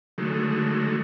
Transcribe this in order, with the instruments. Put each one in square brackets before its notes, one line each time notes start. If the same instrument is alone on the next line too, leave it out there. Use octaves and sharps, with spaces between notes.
[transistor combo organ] D3 D#3 F#3 G#3 A3